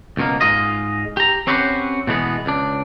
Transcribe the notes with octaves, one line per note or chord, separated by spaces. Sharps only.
C#2 B2 A#3
G#2 G#3 F4 D#5
G4 A#5
C4 C#4 F#4 G4 B4 C5
B2 E3 G#3 B3
C#2 D4